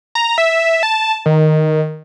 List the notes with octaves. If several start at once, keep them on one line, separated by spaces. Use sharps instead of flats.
A#5
E5
A5
D#3